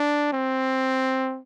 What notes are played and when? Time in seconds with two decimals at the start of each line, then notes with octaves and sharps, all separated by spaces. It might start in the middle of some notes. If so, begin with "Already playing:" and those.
Already playing: D4
0.33 C4